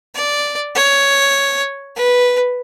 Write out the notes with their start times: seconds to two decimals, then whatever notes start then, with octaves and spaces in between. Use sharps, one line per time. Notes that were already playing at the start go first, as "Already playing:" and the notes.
0.15 D5
0.75 C#5
1.96 B4